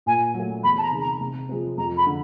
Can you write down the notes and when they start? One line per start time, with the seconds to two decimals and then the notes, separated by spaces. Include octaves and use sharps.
0.06 A#2 G#5
0.34 F#3
0.39 A3
0.63 E2 B5
0.78 A5
0.82 A#5
0.92 C3 D#3 G#3
1.01 A#5
1.21 C3
1.49 F3 G#3 C4
1.77 F2 A#5
1.97 B5
2.06 D3